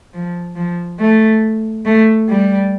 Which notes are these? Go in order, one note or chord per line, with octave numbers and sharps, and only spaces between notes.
F3
F3
A3
A3
G3